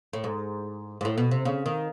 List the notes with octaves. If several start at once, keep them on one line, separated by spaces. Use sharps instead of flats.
A2
G#2
G#2
A2
B2
C3
C#3
D#3